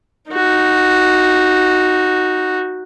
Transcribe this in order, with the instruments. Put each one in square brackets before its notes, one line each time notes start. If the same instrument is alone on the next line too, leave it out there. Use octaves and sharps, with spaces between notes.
[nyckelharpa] D#4 F#4